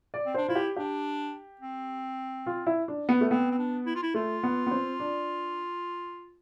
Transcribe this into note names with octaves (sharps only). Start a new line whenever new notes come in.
D5
C4
D4 C5
E4 F4
G4
D4 G4
C4
F4
E4
D4
B3
A3
B3 C4
C4
D4
E4
F4
E4
A3 F4
B3
B3
C4
D4